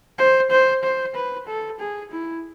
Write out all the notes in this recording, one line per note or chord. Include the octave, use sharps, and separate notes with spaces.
C5
C5
C5
B4
A4
G#4
E4